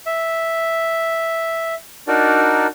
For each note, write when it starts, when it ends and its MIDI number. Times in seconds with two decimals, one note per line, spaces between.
0.06 1.74 76
2.08 2.67 62
2.08 2.67 63
2.08 2.67 66
2.08 2.67 70
2.08 2.67 74